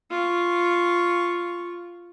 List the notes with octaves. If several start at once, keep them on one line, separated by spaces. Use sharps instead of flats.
F4 C#6